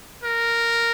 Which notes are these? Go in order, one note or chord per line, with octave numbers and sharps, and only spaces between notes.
A#4